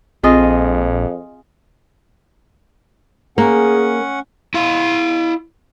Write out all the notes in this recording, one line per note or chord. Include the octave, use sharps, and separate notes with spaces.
A#1 F2 C4 F4 G#4 D#5
A#3 C#4 G#4 F#5
E4 F5